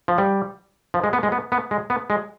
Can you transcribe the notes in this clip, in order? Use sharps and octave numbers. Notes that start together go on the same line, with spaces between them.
F3
G3
F3
G#3
B3
G#3
B3
B3
G#3
B3
G#3